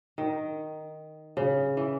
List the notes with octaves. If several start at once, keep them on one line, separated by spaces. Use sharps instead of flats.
D#3
C#3
E3